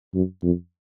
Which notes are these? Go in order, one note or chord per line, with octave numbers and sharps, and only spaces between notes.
F#2
F2